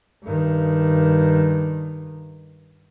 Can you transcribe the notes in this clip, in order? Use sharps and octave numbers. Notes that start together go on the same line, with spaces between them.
G2 D#3